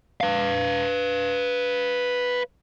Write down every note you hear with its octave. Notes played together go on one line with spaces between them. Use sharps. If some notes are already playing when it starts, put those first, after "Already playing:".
B4 F5